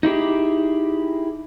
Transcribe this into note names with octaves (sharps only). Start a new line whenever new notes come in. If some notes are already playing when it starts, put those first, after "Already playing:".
D#4 E4 G4 G#4